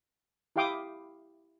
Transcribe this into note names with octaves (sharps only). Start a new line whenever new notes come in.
E4 G4 F5 G5 D6 D#6